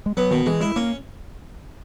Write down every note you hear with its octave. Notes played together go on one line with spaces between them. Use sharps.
G#3
F#3 B3
B2 D#3
E3 G#3
G#3 E4
A#3 C#4